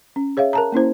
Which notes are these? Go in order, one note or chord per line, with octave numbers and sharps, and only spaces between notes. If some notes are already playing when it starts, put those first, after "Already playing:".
C#4
G#4 C#5 E5 F5
A#4 A5 A#5
A#3 C#4 E4 C5